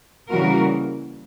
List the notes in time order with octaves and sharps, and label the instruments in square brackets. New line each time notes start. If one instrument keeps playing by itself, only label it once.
[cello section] C#3 E3 G3 A#3 F#4 A#4